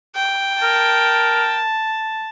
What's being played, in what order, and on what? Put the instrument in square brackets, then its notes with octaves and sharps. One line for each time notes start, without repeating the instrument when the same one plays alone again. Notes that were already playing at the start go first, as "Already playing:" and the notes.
[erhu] G5
[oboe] A#4 [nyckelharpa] A5